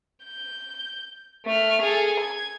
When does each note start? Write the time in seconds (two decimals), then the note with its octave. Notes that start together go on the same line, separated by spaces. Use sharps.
0.24 G6
1.46 A3 F6
1.82 G#4 A4
2.20 G#6